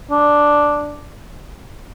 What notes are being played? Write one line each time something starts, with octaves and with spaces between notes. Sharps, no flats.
D4